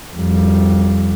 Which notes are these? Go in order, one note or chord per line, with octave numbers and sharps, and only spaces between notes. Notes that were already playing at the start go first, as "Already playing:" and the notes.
F2 G3